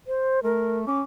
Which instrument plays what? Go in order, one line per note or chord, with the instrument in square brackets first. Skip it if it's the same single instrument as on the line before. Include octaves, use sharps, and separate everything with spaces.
[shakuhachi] C5
[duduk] A3 [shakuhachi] A#4
[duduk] C#4 [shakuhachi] D6